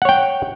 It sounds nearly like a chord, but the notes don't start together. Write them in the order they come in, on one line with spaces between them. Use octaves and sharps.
F#5 C#5 G5